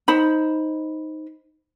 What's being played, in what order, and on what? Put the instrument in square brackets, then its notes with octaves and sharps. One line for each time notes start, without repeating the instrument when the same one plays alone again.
[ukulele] D#4 C5 B5